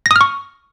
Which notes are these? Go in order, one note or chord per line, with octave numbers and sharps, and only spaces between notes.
C#6 D#6 F6 A#6